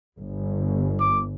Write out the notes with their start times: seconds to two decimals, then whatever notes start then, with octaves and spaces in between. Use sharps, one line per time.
0.17 G1
1.00 D6